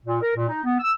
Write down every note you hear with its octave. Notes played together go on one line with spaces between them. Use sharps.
A#2
A#4
A#2
D#4
B3
E6